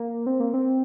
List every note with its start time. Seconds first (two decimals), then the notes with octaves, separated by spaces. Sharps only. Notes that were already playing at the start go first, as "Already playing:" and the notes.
Already playing: A#3
0.26 C4
0.40 A#3
0.54 C4